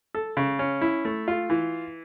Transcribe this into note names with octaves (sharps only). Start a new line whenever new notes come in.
A4
C#3
C#4
E4
A3
F4
E3